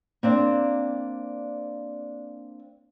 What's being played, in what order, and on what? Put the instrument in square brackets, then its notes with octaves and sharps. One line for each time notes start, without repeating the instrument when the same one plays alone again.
[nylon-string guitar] A#3 C4 D4